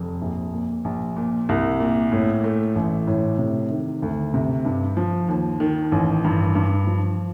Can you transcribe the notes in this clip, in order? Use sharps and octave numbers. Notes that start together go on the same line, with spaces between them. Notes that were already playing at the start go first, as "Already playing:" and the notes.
Already playing: F1 F2
A#1
A#2
A#1
A#2
C2
A#2
A2
A3
A1
A2
C3
D#3
D2
C3
G2
F3
D#2
D#3
A1
G2
G2
F3